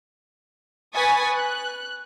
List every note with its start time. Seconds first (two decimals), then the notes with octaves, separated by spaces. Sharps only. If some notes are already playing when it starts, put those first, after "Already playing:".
0.95 B4 G#5 C#6 D#6 A6 B6
1.35 F#6